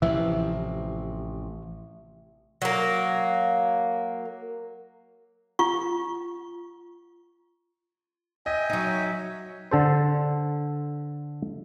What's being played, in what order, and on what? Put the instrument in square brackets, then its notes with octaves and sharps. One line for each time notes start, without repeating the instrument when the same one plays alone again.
[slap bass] A1 C3 F3 [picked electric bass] E3 [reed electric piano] E5
[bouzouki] F#3 A#3
[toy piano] F4 C#6
[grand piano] D#5 [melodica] E5 G5 G#5
[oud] F#3 D#4
[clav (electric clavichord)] D3 A4 C5